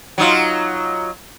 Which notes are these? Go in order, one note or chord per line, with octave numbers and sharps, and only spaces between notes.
F#3 D#4 F4